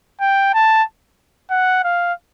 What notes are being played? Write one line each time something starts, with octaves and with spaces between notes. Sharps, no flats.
G5
A5
F#5
F5